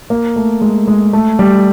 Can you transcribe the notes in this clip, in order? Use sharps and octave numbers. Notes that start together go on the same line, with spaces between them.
A#3
A3
G#3
G#3
A3
G3